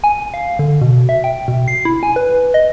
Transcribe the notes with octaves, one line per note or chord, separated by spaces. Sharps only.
G#5
F5
D3
B2
E5
G5
B2
C7
E4
G#5
B4
D#5